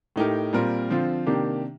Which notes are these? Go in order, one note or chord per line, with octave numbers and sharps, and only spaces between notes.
A2 A3 D#4 G4 A#4
A#2 G3 C4 F4 A#4
D3 F3 C4 F4
C3 D#3 A#3 D4 G4